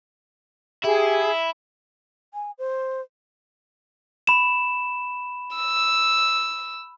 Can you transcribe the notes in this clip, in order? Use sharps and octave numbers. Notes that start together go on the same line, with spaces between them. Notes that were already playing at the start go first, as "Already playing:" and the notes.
E4 G4 G#4
G#5
C5
B5 E7
E6